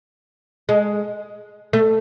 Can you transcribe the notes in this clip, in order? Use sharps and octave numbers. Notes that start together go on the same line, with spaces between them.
G#3
A3